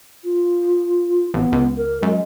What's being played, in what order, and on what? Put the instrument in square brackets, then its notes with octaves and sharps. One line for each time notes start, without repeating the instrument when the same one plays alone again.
[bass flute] F4
[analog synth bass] A1 [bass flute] B3
[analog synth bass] C#2
[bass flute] A#4
[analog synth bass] F#2 [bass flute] G#3